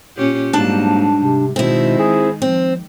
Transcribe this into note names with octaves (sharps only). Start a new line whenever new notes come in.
A#2 C#4 G4
G#2 F#3 G3 A#3 D4 A5
C3
B2 D#3 G#3 C4 E4
G#4
F3 C4